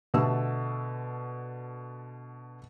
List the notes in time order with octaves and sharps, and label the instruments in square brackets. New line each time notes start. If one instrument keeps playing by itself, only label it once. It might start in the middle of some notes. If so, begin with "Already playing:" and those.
[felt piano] B2 D3 A3 E6